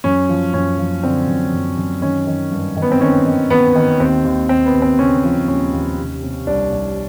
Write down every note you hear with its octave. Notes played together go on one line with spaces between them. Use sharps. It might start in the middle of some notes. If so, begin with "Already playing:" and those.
F#2 C#4
F3
F#2 C#4
F3
D3 C4
F#2
F#2
F#2
D#3 C#4
D#3
G2
D#3
B3
C4
D#3 C#4
D#3
D#3 B3
D#3
D#2 C4
D#2
D#2 C4
B3
D#2
C4
C#3 C#4
F3
D#2 C#4
D#2
C3
C3
C2 D4
C2